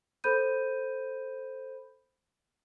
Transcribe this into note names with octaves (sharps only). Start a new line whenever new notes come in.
A4 C5 B5 G6 D#7